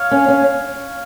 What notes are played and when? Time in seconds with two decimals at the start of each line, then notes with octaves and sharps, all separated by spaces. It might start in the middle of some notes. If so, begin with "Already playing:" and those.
Already playing: C#5 F5
0.11 C#4
0.28 C#4